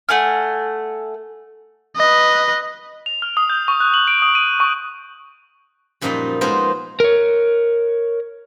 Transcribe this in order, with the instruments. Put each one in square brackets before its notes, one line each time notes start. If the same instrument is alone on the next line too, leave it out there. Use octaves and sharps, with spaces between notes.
[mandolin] A3 F#5 G#5 F6
[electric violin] B4 D#5
[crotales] F7
F6
D#6
G6
C#6
F#6
F#7
D7
D#6
D#7
C#6
[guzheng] F#2 A#2 F3 G3 D#4 D#5
F3 G#3 B3 D#4 A#4 C5
[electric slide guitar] A#4 C#5